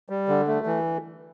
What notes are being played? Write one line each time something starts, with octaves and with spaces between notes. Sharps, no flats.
G3
D3
A3
E3